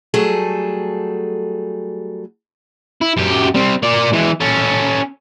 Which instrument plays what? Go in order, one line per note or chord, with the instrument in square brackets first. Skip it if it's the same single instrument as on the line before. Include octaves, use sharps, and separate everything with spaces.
[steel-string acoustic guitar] F#3 G3 A3 G#4 A4
[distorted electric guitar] E4
F#2 G4
G3 C4
A#3 D5
E3 G#3
C#4 A4